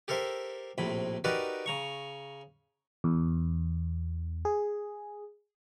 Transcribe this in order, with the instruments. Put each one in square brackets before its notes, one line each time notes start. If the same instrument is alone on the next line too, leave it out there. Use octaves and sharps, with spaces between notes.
[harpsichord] G4 A4 A#4 C5 E5
A#1 A2 C3 B5
D#4 F#4 G4 A#4 B4 D5
C#3 A#5 C#6
[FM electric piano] E2
G#4